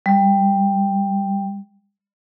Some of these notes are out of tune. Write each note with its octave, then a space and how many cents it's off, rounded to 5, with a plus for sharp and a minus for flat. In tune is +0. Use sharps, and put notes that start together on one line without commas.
G3 +10